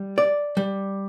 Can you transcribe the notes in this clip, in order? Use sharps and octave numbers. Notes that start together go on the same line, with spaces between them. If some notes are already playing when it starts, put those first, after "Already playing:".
Already playing: G3
D5
G3